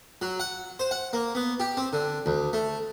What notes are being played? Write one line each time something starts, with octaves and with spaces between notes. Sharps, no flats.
F#3
F#5
C5
F#5
A#3
B3
G4
C4
D3
D2
A3